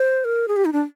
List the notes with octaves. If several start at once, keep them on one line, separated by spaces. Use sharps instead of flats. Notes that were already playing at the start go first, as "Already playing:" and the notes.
Already playing: C5
A#4
G#4
G4
D#4
D4